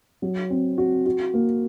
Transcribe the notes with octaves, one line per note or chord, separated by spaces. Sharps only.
F#3
C4
F#4
F#4
A#3